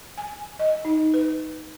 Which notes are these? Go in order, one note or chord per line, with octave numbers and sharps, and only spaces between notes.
G#5
D#5
D#4
B4